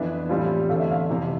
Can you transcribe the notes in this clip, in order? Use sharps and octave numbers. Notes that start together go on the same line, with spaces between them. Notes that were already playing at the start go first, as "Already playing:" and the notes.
Already playing: F2 E3 B3 D4 E5
A2 E3 G3 C4 F4
E2 D3 A3 F5
E5
F5
F2 C3 E3